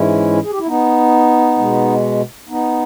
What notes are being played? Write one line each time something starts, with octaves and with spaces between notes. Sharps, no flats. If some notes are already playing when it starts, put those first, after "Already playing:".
Already playing: G#2 E3 G#3 C#4 E4
G#4
G4
E4
B3 D#4
B2 G#3
B3 D#4